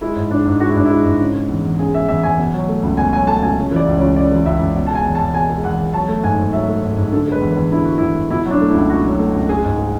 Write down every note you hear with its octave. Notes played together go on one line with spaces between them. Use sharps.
G#3 E4
G#2
G#3 D4
G#2
G#3 F#4
E4
G#2 D4
G#3 E4
G#2
C#3
G#3
E2
E2
C#3 G#4
G#3 E5
E2 E5
E2 G#5
B2
F#3
A3
C#2
B2 G#5
F#3 G#5
A3 A5
C#2 G#5
C#3
E3
D5
C#2
C#5
C#2
C#3 D5
E3
C#2 E5
C#2
B2
A5
G#3 G#5
E2
A5
E2
B2 G#5
G#3
E2 F#5
E2
F#3 A5
A3
G#2 G#5
G#2
F#3 E5
A3
G#2
G#2
D3 A4
G#3 B4
E2
B4
E2
D3 E4
G#3 F#4
E2 E4
E2
B2 E4
F#3 D4
A3
E4
C#2
B2 F#4
F#3
A3
C#2
G#3 G#4
G#2
G#3